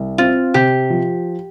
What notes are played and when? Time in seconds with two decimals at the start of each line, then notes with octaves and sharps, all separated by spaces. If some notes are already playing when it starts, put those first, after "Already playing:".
Already playing: C2
0.18 C4 F4
0.54 C3 G4
0.90 F3